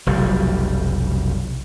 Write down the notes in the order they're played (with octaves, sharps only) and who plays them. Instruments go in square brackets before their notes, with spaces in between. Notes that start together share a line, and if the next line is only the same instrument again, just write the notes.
[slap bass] F1 B1 G3